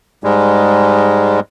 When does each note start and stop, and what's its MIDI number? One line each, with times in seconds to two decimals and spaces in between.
0.24 1.40 44
0.24 1.40 55
0.24 1.40 56